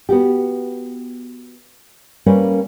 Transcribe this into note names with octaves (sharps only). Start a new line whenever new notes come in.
B3 F#4 G4
G3 A#3 C#4 A#4 B4